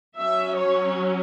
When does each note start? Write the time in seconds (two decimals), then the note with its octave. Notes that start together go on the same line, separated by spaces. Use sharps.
0.18 F#3 C#4 E5
0.58 C#5